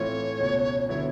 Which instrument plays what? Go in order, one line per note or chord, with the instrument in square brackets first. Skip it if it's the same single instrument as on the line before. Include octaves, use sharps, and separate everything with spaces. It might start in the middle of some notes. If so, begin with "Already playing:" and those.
Already playing: [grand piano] A2 E3 A3 C4 F4 [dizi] C#5
[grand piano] C#2 B2 G#3
[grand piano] D3 F#3 B3 E4 [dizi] C#5